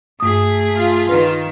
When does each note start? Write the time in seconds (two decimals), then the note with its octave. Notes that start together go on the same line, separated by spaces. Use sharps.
0.20 G2 A3 G#4 D#6
0.75 F4
1.09 D#3 B4